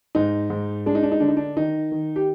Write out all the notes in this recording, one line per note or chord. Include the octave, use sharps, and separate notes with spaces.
G#2 D#4
G#2
G#3 D4
D#4
D4
D#4
D3 D4
D#4
D4
D#3 D#4
D#3
G4